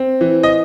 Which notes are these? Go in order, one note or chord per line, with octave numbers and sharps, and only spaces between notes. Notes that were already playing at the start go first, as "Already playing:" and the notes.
Already playing: C4
E3
D#5